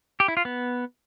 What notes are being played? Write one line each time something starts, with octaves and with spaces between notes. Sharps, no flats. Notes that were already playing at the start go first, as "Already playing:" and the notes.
G4
E4
F4
B3